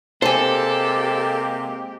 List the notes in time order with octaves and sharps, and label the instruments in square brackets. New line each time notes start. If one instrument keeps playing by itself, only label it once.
[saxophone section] C3 G#3 A#3 [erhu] G4 [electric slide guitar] A4 [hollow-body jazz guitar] C5 G#5